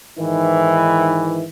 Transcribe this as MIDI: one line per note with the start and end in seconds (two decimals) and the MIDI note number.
0.19 1.45 44
0.19 1.45 51
0.19 1.45 52